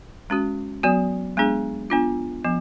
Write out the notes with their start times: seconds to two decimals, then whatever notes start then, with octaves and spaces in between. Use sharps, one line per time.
0.30 G#3 C#4 F#4
0.83 F#3 B3 F#4
1.37 G#3 B3 D4 G#4
1.90 B3 D4 F4
2.45 F3 B3